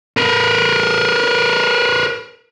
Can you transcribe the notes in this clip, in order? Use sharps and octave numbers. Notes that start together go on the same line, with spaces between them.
A#4 B4